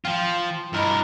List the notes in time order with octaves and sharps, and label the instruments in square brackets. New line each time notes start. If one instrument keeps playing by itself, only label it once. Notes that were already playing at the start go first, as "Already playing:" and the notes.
[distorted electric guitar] F3 F4 [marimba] G5
[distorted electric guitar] G2 A#4 [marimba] E4 D#5 B5
[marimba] F#4